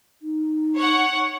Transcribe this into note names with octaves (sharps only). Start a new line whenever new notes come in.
D#4
C#5 F#5